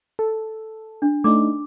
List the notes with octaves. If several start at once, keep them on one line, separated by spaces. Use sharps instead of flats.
A4
D4
A3 D4 D#4 D6